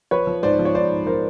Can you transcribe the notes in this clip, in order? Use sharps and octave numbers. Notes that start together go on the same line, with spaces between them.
F3 B4 C#5
F3
G#2 C5 D5
F3
C#5
G#2 C5 D5
G#2
F3 A#4 C5